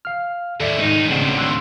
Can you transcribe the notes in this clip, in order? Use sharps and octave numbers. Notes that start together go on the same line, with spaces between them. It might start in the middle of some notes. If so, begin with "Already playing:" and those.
F5 F6
D#2 A2 A4 D5 E5
G#2 D#4
G#1 C#3 C4 D4 F#5
C6 E6 F#6